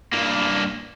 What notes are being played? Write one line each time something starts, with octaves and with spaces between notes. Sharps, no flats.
G2 A#3